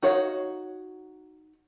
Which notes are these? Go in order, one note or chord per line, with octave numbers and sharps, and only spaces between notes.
D#4 F#4 C#5 F5